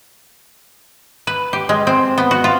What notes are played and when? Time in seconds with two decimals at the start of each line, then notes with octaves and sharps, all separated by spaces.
1.27 B4
1.53 G4
1.69 G#3
1.87 C4
2.18 B3
2.31 F#4
2.44 F4